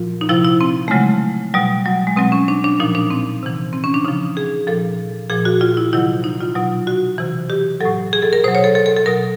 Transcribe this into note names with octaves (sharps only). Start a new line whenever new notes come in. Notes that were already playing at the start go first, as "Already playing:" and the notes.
Already playing: A#2 F3 F4
D#4
C3 F3 E4
E4
C4
A3
C#3 F#3 G#3
B2 F#3 G3
F#3
G#3
B2 F#3 C4
C#4
D4
D4
A#2 F3 D#4
D4
C4
C3 E3
C4
C#4
D4
C#3 F3 D#4
G#4
A#2 F3 A4
A#2 F3 G#4
F#4
F4
E4
C3 D#3 F#3 E4
D#4
F4
B2 F#3
F#4
C3 E3
G4
A2 F#3 A4
G#4
A4
A#4
B2 F#3 C5
C#5
A4
A4
A4
A4
B2 F#3 A#4